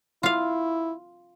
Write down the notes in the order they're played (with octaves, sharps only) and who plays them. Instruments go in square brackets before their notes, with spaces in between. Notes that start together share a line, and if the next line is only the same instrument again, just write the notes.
[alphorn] E4 [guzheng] F4 F5